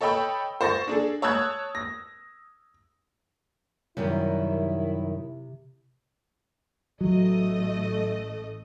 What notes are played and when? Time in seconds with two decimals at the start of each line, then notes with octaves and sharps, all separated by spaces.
0.01 A4 C#5 D#5 G5 B5 E6
0.61 C5 C#6 A6 A#6
0.88 D4 G#4 A4
1.22 C#5 A5 D#6 E6 F#6 G#6
1.75 A#6
3.97 F#2 C3 D#3 G3 E4
7.01 A1 F#3 A3 D#5